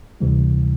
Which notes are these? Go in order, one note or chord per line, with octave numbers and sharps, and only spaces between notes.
D2 C3 E3 G3